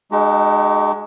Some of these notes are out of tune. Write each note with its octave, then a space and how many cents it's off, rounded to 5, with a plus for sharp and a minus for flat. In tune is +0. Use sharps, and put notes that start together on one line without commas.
G#3 +15 D#4 -30 F#4 +45